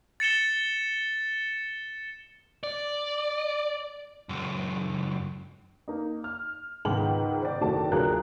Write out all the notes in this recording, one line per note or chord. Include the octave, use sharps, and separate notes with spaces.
A6 C#7 E7 G7
D5
C#2 F#2
A#3 D#4
F6
C#2 G#2 D#3 B3 B4 F#7
C5 D5
F#1 D#3 A3 F#4 D5 A5
D2 F#3 F4 G#4 A#4 F#6